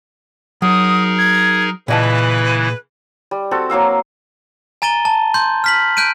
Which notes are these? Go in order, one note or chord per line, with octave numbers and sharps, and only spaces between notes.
F#3 D#4 G#4 A#4 D#6
G#6
A#2 C#3 E3 E4 B4 D#5 A5
G3
C4 F#4 A4
F#3 A#3 F5 E6
G#5 A#5 A6 D#7 G7
A5
C6 G6
F6 B6 F#7
F#6 G6 D7 D#7